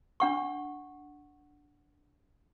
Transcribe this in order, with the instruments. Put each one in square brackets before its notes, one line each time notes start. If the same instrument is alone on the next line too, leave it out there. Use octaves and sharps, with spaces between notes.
[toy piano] D4 F#5 C#6